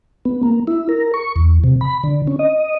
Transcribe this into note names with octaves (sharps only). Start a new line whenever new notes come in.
B3
A#3
E4
A#4
C#6
E2
C3
B5
D3
C#4
D#5